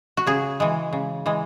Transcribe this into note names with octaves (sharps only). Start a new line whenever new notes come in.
F#4
C#3 G#4
E3 G#3
C#3
E3 G#3